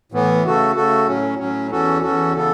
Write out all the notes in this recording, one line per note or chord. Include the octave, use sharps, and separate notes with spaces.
A2 E3 B3
C#3 A3 F#4 A4
C#3 A3 F#4 A4
A2 F#3 C#4
A2 F#3 C#4
E2 E3 C#4 F#4 A4
E2 E3 C#4 F#4 A4
C#3 E3 B3 A4